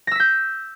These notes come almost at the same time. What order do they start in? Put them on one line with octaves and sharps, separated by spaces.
A#6 E6 B6 G6